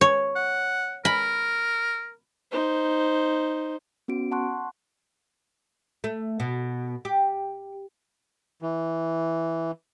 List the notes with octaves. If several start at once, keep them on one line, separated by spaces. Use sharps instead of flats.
C#5
F#5
A#4 B5
D#4 C5
B3 C#4 F#4 D7
F#5 A5 C6 C#6 F#6
A3
B2
G4
E3